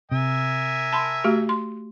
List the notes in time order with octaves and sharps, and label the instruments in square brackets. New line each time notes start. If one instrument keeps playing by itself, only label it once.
[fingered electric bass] C3 [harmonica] A#4 E5 G#5
[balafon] A5 B5 C6
A3 F#4 G4
C6